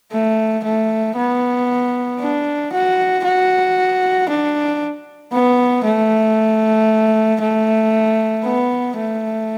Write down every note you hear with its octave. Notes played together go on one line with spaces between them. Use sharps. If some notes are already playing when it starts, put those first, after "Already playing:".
A3
A3
B3
D4
F#4
F#4
D4
B3
A3
A3
B3
A3